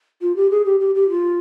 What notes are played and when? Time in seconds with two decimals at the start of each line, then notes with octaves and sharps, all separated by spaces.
0.22 F4
0.36 G4
0.51 G#4
0.65 G4
0.80 G4
0.95 G4
1.10 F4